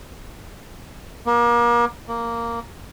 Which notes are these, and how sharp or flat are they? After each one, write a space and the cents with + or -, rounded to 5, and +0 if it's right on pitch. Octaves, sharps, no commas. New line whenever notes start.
A#3 +35
A#3 -5